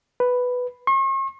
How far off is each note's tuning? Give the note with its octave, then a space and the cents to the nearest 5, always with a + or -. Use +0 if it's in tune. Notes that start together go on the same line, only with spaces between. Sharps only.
B4 +5
C#6 -45